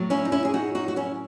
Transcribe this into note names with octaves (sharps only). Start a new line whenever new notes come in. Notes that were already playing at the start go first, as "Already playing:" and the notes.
Already playing: A2 F#3
C#4 E4
D#4
C#4 E4
G#4
D#4 F#4
D#4 F#4
F#4
C#4 E4